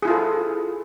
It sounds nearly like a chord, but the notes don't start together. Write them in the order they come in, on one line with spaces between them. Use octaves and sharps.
G#4 E4 F4 A4